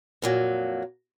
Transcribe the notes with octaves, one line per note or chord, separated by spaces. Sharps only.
F2 A#2 F#3